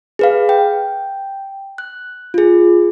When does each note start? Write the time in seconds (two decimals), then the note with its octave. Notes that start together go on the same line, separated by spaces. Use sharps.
0.19 G#4 B4 F5
0.49 G5
1.78 F#6
2.34 F4 G#4